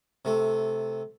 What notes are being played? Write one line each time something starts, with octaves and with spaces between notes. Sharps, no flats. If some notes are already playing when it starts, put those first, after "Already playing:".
C3 A3